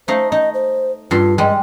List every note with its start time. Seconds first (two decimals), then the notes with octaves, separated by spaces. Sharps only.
0.08 A3 D#4 C5 F5
0.32 D#4 D#5
0.54 C5
1.11 G2 F4 A4 C6
1.38 G3 G#3 D#5